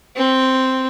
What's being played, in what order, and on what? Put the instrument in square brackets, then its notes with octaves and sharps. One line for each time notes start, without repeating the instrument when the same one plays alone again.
[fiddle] C4